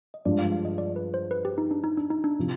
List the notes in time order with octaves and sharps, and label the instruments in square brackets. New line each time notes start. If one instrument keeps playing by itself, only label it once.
[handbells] D#5
[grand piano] G2 F3 G#3 [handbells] D5
[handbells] F5
F5
D#5
D5
B4
C5
B4
G4
D#4
D4
D#4
D4
D#4
D4
[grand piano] C3 F3